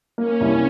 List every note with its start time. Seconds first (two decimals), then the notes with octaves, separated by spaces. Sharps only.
0.18 A#3 C#4
0.41 C2